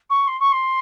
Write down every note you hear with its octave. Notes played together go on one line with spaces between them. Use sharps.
C#6
C6
C#6
C6